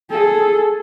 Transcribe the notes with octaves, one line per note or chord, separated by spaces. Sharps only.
G#4 A4